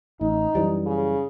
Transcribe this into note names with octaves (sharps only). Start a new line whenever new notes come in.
A1 D#4
F#2 E3 G3
C#3